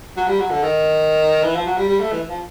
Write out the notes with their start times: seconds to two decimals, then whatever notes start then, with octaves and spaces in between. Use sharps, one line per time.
0.17 F#3
0.28 G3
0.39 F#3
0.51 D3
0.63 D#3
1.44 E3
1.55 F3
1.66 F#3
1.78 G3
1.88 G3
2.00 A3
2.12 E3
2.29 F3